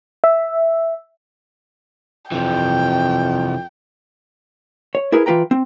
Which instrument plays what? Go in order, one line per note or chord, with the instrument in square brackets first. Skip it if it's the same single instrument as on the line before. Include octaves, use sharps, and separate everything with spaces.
[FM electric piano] E5
[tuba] F2 [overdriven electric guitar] C3 E3 [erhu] G5
[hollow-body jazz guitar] C#5
E4 G#4 A#4 B4 E5
E3 F4 B4 G5 A#5
C4